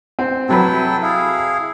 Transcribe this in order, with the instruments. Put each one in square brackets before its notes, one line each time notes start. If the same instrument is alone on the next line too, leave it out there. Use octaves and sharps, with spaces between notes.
[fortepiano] C4
[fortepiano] C3 F#3 B4 [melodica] E4 A4 G5
[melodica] E4 G#4 F5